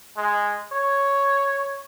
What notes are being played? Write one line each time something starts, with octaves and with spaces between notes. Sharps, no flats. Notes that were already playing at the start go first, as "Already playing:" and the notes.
G#3
C#5